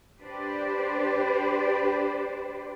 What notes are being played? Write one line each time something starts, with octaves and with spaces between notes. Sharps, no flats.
D4 G4 B4 C5 D5